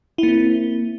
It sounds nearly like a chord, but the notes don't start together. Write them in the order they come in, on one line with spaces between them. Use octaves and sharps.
E4 A#3 C4